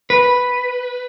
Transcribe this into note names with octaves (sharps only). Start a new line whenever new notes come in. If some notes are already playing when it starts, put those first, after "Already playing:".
B4